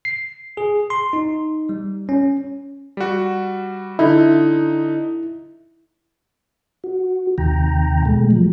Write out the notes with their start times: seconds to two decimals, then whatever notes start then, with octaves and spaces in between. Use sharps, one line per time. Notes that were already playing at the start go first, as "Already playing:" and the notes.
0.05 C7
0.57 G#4
0.90 C6
1.13 D#4
1.69 G3
2.09 C#4
2.97 G3 F#4
3.99 D3 D#4 E4
6.84 F#4
7.38 D#2 C3 D#3 G5 A#5
8.05 B2 G#3 A3
8.31 F3 F#3